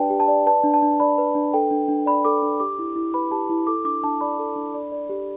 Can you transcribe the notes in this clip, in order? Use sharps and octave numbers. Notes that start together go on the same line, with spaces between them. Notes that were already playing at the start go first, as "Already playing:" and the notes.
Already playing: D4 G4 B4 D5 G5 A5
G4
A5
D5
B4 A5
D4
A5
D4
D5 B5
B4
D4
A4 G5
D4
D4
D5 B5
A4 D6
D4
G4 D6
E4
E4
B4 B5
G4 A5
E4
A4 D6
D4 D6
D4 A5
D5 B5
A4
D4
D5
D5
G4